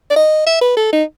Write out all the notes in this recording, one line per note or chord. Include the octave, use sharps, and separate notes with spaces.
D5
D#5
E5
B4
A4
D#4